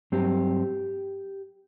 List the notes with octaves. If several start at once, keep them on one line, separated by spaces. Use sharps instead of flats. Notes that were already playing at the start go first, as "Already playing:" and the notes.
G2 F#3 C4 G4